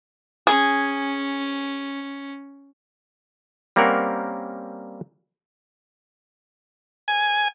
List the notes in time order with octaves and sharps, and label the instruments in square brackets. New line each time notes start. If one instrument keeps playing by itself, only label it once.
[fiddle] C#4 [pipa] G#4
[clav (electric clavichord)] G3 A#3 C4 C#4 A#4 F#5
[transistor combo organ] G#5